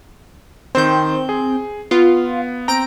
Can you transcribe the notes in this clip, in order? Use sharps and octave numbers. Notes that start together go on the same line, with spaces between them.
D#3 C4 C5 G6
G#4
B3 F4
C4 G5 A#5 A#6 D7